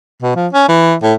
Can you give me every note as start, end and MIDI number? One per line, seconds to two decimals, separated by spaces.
0.22 0.35 47
0.36 0.48 53
0.53 0.65 61
0.69 0.95 52
1.03 1.14 45